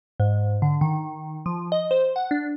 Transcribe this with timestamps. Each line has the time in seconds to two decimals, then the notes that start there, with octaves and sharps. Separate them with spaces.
0.20 G#2
0.62 D3
0.81 D#3
1.46 F3
1.72 D#5
1.91 C5
2.16 F#5
2.31 D4